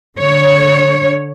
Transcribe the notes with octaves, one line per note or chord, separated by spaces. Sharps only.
D3 C#5